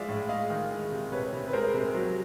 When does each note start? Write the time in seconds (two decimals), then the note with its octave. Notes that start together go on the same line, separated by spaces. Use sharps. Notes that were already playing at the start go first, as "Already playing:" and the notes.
Already playing: F3 G#3 D5 E5 F5
0.08 A2
0.29 G#3 D#5 F5
0.50 D#3
0.71 G#3
0.92 C3
1.12 C3 B4 C#5
1.33 C3
1.48 B4
1.53 G#3 A#4 C5
1.74 C3
1.94 F#3